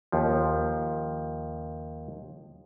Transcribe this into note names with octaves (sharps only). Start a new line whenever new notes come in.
D#2 F3